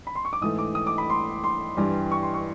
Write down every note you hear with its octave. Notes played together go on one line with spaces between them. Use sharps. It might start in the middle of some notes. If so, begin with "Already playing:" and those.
B5
C6
C#6
D6
G#2 E3 A3 D#6
D6
D#6
D6
B5
C6
C6
G2 E3 G3
C#6
C6
C#6